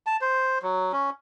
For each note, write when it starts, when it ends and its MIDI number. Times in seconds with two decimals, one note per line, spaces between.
0.07 0.16 81
0.21 0.58 72
0.62 0.92 54
0.92 1.10 61